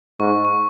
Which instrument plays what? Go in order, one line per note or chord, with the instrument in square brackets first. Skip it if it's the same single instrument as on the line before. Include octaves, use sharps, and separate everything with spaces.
[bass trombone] G#2 [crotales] C#6
[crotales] C#6